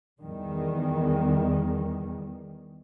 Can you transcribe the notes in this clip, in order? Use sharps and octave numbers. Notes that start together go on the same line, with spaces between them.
E2 D#3 G3